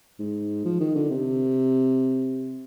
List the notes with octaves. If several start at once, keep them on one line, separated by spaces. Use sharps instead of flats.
G#2
F3
D#3
D3
C3